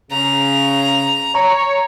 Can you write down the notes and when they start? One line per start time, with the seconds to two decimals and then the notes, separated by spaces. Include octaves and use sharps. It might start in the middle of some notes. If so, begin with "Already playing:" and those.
0.11 C#3 A#5
1.35 C#5 A#5